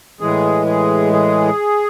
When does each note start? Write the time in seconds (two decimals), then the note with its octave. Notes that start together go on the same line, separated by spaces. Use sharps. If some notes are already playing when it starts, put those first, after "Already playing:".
0.20 A2 E3 G#3 G#4
0.67 G#4
1.13 G#4